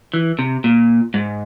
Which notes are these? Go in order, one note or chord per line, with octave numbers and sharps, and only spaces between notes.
E3
C3
A#2
G#2